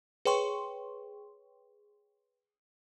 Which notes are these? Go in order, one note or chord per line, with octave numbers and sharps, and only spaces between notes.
G#4 B4 C#5 G5 C6 C#6